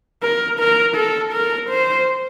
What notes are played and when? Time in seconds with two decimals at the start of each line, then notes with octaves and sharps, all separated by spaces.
0.23 A#4
0.60 A#4
0.96 A4
1.33 A#4
1.70 C5